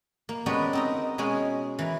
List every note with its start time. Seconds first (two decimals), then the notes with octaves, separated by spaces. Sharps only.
0.29 A#3
0.46 G#3 B3 C#4 D4 F#4 G4
0.73 C4 D#4 A#4
1.18 B2 G#3 C#4 G#4
1.79 E3 A#4